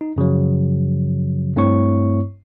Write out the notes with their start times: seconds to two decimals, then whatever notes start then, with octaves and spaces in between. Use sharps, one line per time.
0.01 D#4
0.16 F#2 C#3 F3 F#3
1.56 G2 A3 C4 E4 C#5 C#6